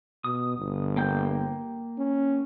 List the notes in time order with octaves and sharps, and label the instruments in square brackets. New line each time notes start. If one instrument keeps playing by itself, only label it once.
[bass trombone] B2 [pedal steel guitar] D#6
[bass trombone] G1
[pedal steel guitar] A#3 G5 G6
[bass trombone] C#4